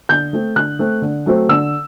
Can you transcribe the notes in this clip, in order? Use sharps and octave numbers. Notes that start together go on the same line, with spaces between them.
D3 G6
A3 C4
D3 F#6
A3 C4
D3
F#3 A3 C4
D3 E6